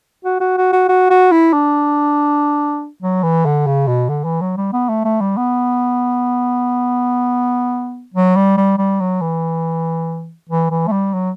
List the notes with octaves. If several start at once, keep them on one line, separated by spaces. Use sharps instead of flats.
F#4
F#4
F#4
F#4
F#4
F#4
E4
D4
F#3
E3
D3
C#3
B2
D3
E3
F#3
G3
B3
A3
A3
G3
B3
F#3
G3
G3
G3
F#3
E3
E3
E3
A3
G3
F#3